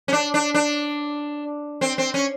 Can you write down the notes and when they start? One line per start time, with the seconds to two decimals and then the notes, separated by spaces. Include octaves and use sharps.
0.08 C#4
0.13 D4
0.34 D4
0.54 D4
1.81 C4
1.98 C4
2.14 C#4